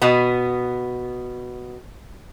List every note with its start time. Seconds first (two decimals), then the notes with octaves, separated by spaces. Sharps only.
0.02 B2 B3